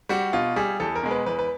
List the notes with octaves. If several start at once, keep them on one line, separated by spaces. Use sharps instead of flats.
G3 F#4
B2 F4
G3 G#4
E2 A4
A#4
B2 G#3
B4
E2 B4
B4